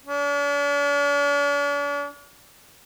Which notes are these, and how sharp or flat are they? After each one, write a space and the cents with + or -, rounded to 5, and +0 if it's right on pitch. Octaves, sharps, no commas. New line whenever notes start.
D4 -45